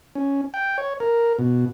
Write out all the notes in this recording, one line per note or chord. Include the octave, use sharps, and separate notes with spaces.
C#4
G5
C#5
A#4
B2